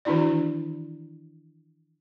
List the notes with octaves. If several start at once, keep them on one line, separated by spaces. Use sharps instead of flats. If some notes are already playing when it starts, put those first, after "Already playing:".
D#3 E3 D4 E4 F#4 D5